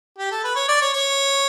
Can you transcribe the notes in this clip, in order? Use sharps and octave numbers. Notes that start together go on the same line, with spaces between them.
G4
A4
B4
C#5
D5
C#5
C#5